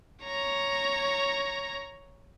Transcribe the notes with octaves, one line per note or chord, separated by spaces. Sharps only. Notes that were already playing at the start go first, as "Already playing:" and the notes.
C#5 A#5